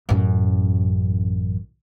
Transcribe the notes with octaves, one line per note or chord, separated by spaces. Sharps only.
A1 F#2